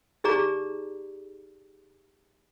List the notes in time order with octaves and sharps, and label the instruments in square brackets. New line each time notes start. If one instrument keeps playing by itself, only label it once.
[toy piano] D#4 G4 G#4 D5 A#5